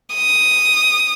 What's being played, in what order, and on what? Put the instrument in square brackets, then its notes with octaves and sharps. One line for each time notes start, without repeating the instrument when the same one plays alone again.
[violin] D#6